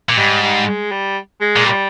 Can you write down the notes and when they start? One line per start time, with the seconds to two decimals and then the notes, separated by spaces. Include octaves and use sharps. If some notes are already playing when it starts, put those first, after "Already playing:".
0.09 A#2
0.17 G#2 G3
0.43 G3
0.67 G#3
0.91 G3
1.41 G#3
1.56 A#2
1.66 G3